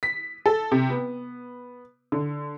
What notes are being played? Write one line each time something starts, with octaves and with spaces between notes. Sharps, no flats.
B6
A4
C3
B3
D3